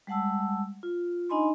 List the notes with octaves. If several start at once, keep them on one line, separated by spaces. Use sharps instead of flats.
G3 G#3 F#5 A5 E6
F4
D4 D#4 D#5 G#5 B5 C6